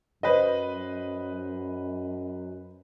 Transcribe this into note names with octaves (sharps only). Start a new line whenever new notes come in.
F#2 B4 C5 D#5